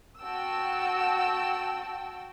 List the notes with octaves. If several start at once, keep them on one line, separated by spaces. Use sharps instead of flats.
F#4 G5 A5 E6